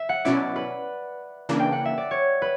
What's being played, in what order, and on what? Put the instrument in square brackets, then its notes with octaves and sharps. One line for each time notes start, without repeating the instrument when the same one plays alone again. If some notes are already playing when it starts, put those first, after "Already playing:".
Already playing: [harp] E5
F#5
[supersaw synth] B2 F#3 C#4 E4 [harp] D5
[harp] B4
[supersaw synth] C#3 E3 A#3 D4
[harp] G5
F#5
E5
D5
C#5
B4